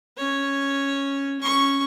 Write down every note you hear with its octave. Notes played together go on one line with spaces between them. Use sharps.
C#4 C#5
C#4 C#6